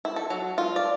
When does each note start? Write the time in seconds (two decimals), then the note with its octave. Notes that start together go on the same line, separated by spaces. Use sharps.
0.05 E4
0.16 A4
0.30 F#3
0.58 F4
0.76 D5